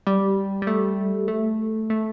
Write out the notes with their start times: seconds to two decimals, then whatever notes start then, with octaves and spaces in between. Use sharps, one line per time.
0.07 G3
0.62 G3
0.67 A3
1.28 A3
1.90 A3